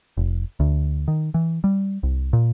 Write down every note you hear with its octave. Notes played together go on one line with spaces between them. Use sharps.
F1
D2
D#3
E3
G3
C2
A#2